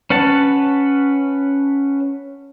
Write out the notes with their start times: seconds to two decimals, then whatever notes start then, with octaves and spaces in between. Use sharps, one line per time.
0.10 C#4 B4 F#5 A5